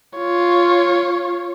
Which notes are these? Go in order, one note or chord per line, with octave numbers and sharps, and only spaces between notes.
F4 C#5